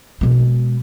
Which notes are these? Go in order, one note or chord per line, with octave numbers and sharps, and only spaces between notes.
B2 G#3